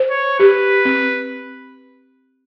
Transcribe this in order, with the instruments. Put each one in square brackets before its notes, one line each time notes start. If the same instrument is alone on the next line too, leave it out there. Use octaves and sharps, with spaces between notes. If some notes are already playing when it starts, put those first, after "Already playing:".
Already playing: [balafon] C5
[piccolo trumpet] C#5
[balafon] G4 [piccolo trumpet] B4
[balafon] C4